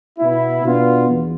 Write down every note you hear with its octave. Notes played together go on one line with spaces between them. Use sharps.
B2 B3 E4
B2 B3 D4 F4
E2